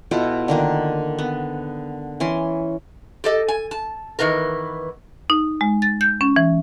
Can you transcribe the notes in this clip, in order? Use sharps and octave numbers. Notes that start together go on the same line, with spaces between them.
B2 E4 F4 A4
D3 D#3 A#3
B3
E3 C#4 C6
G4 A4 D#5
G#5
A5
D#3 E3 B3 A#4
D#4
G#3
A6
G6
C#4
E3